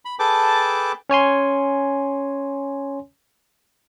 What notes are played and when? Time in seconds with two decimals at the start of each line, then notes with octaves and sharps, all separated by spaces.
0.05 B5
0.19 G#4 A4 B4 G5 A5 D6
1.09 C#4 C#5 G#5 C6